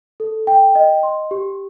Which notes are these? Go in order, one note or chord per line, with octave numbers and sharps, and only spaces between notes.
A4
G5
D#5
C6
G4